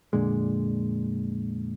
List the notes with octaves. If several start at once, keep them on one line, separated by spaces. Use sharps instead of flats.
F2 A#2 D3 G#3